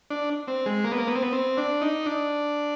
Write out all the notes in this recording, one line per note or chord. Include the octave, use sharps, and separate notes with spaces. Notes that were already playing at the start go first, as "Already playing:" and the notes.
D4
C4
G#3
A#3
B3
A#3
B3
C4
B3
C4
D4
D#4
D4